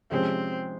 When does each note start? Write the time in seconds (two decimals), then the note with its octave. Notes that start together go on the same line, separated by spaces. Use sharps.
0.11 C3 F3 G#3 C4 C#4